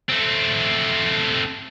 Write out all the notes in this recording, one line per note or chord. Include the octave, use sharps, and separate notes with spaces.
A3 C4